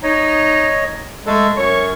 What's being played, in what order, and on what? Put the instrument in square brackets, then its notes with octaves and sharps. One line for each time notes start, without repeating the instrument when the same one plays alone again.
[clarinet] D#4 [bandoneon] C#5 D#5
[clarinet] G#3 [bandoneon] A3 A4
[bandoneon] F#2 C#6 [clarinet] C#5